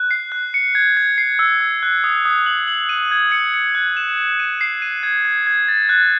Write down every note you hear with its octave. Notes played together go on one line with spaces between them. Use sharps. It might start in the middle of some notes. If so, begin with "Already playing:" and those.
Already playing: F#6
C7
F#6
C#7
G#6
G#6
C7
E6
E6
F#6
D#6
D#6
F#7
F#7
D#7
G#6
C#7
C#7
F#6
E7
E7
D#7
C7
D#7
G#6
G#6
G#6
A6
F#6